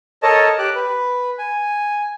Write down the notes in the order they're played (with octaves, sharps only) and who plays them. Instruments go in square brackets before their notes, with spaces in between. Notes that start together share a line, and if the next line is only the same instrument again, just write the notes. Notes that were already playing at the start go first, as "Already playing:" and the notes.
[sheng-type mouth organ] A4 A#4 C#5 D#5 A5
G4 D6 F#6
B4
G#5